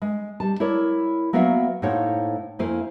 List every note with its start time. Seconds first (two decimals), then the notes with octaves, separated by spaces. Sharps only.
0.02 G#3
0.40 G3 A5
0.60 E4 A#4 C#5 D5
1.33 F#3 A#3 B3 F#4 E5 F5
1.82 A2 A#3 D#4 C5 C#5 F#5
2.59 F2 A3 A#3 E4 C5 G#5